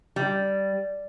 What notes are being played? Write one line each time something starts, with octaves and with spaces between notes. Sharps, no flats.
G3